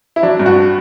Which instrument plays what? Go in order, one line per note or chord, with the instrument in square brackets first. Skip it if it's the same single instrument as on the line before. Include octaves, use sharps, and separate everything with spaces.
[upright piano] E4
F#3 D4
G2
F#4